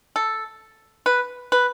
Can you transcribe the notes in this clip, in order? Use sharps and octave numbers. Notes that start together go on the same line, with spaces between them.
A4
B4
B4